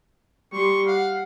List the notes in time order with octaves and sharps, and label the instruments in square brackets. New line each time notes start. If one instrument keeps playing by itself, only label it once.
[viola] G3 C6 [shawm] C#6
[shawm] F5 [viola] F#5